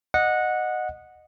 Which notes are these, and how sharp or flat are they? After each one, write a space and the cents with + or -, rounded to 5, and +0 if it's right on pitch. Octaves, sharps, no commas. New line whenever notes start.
D#5 -15 F#5 -15